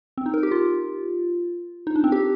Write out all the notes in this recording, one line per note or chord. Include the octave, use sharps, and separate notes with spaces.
C4
D#4
A#4
G4
F4
D#4
D4
C4
G4